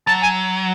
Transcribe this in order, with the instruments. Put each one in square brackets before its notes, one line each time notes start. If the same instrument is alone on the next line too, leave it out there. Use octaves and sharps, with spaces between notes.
[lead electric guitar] F#3 [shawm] A5
[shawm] G#5